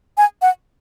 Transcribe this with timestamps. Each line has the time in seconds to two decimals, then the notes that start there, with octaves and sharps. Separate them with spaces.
0.17 G#5
0.42 F#5